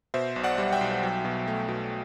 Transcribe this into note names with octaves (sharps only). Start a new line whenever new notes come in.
B2 C5 E5
B1
D5 F#5
G3
E5 G5
B1
F#3
B2
A3
B2